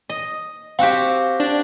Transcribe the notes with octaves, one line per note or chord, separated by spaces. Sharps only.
D#5
C4 F#4 G4 F5
D4